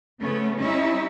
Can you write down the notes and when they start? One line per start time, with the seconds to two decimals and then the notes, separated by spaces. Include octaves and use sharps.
0.20 C#3 F3 A3 B3 C#4
0.57 G3 C#4 D#4 E4 E5